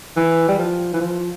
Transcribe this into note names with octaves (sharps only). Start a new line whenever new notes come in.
E3
G3
F3
E3
F3